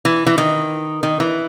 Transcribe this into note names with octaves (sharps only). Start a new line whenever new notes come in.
E3
E3
D#3
D#3
E3